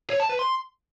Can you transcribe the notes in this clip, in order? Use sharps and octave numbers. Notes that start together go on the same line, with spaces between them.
C#5
A5
B4
C6